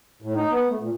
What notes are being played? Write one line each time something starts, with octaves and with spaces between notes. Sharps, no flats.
A2
D#4
B3
A3
A#2